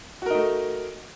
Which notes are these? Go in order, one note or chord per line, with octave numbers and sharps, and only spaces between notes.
A3 D#4 F#4 A#4